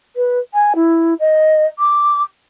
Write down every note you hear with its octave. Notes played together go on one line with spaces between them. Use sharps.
B4
G#5
E4
D#5
D6